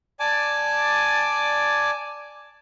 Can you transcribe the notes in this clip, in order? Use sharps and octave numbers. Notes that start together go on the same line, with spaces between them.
D5 G#5 A5 D6